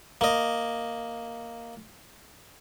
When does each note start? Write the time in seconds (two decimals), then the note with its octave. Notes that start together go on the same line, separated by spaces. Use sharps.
0.21 A#3 D#5